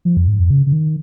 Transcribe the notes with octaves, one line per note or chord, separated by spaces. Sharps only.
F3
F2
G#2
F2
C#3
C#3
D#3